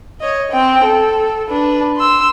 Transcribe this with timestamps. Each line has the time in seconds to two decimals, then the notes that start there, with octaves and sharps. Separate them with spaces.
0.21 C#5 D#5
0.52 C4 G5
0.84 A4
1.49 D4 B4
1.96 C6 E6